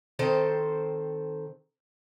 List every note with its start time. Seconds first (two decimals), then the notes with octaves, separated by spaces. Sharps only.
0.19 D#3 C4 A4 C5